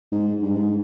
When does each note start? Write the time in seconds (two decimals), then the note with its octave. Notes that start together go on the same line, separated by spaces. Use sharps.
0.12 G#2
0.42 G2
0.53 G#2